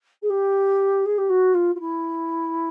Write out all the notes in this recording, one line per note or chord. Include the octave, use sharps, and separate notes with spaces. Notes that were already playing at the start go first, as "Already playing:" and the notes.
G#4
G4
G#4
G4
F#4
F4
F4
E4